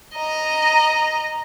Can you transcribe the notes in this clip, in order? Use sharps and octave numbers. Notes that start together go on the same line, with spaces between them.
D#5 A#5